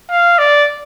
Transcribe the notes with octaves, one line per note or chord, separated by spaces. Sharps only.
F5
D5